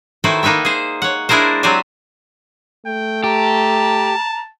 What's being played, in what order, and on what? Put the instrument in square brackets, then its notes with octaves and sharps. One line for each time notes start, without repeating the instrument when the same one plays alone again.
[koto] D#3 A3 E4 F#4 B4 C5
A#3 D#4 B4 E5 G5
G#4 C5
C#5 F#5
G#3 D4 E4 G#4 A#4 C5
F#3 C4 G4 C5 D5 G#5
[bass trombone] A3 [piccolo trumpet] G5
[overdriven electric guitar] G4 [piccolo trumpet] A5 [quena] A#5